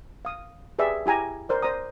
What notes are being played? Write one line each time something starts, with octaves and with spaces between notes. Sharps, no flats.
F5 D#6
G4 G#4 B4 D5 E5
E4 G4 G#5 A#5
A#4 C5 D5
C5 D5 A#5 D#6